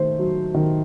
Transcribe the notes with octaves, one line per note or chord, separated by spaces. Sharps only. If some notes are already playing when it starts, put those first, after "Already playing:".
Already playing: D#3 A3 C5
F#3
D#3